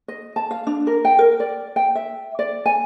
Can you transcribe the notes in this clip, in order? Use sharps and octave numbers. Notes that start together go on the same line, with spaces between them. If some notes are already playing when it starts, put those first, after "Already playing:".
D#5
A5
F5
D4
A#4
G5
A#4
D5
G5
E5
D5
G#5